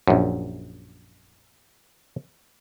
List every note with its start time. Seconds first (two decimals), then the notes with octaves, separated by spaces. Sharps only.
0.08 A#1 F#2